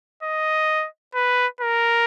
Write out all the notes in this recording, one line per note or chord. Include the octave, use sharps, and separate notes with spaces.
D#5
B4
A#4